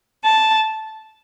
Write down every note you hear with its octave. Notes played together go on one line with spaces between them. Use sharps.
A5